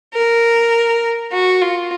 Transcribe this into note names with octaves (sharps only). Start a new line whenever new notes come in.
A#4
F#4
F4